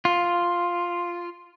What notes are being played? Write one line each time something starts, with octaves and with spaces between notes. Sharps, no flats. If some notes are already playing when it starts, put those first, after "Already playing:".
F4